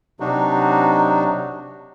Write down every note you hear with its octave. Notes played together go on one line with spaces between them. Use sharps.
C3 F#3 D4 D#4 F#4